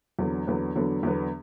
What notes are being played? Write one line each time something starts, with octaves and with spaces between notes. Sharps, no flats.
E2 D3 F#3 B3
E2 D3 F#3 B3
E2 D3 F#3 B3
E2 D3 F#3 B3